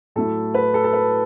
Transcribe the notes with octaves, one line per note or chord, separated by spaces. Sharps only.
A2 F#3 A3 E4 A4
B4
A4
A4
B4